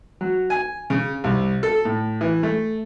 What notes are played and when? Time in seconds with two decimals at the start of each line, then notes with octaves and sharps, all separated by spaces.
0.21 F#3
0.50 G#5
0.90 C#3
1.24 C2
1.63 A4
1.85 A2
2.21 E3
2.43 A3